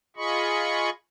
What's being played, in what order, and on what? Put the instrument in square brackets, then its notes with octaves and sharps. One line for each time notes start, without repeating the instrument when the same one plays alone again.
[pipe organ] F4 G#4 D#5 B5 C#6